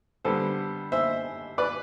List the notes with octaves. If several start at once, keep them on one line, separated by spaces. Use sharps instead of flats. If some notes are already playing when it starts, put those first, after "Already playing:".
D3 G3 B3 A4 C5
C5 E5
B4 D5